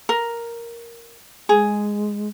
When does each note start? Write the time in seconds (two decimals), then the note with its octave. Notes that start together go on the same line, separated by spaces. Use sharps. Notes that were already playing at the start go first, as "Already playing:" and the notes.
0.09 A#4
1.49 G#3 G#4